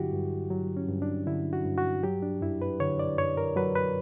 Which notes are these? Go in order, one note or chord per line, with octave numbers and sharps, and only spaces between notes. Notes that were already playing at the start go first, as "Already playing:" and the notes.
Already playing: G2 D3 F#3 E4 F#4 G4
G2
F#3
C#4
G2
D4
D3 E4
F#4
G2
F#4
F#3 G4
D4
F#2 E4
B4
D3 C#5
D5
F#2 C#5
A#4
F#3 B4
B4